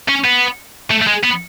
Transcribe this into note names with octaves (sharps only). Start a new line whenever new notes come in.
C#4
B3
A3
A3
G#3
B3